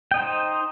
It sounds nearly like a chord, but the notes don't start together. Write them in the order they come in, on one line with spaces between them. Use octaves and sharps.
G5 D#5 D#4 C5